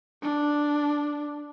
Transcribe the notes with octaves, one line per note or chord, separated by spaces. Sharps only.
D4